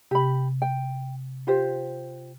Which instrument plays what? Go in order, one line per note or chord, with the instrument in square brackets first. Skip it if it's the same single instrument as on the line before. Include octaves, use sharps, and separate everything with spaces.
[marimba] C3 [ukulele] G4 B5
[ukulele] G5
F4 G4 C5